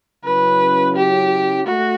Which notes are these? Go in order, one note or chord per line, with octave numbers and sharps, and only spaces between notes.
C#3 F#3 C#4 E4 B4
G4
A3 F#4